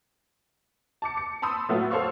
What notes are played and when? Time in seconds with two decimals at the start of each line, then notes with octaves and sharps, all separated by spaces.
1.02 A5 D6 C#7
1.17 C#7
1.42 A5 B5 C6 D#6 E6
1.69 A2 F#3 A3 B3 F4
1.91 A4 C5 C#5 F5 C#6 E6